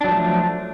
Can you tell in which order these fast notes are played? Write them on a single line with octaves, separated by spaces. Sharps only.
D4 F#3 F3 A3